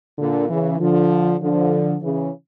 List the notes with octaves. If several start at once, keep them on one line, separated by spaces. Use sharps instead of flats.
A#2 D3
C#3 E3
D3 F3
D3 F3
C#3 E3